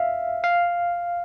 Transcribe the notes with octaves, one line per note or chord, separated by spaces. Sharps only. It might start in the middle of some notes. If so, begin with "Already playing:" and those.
Already playing: E5 F5
F5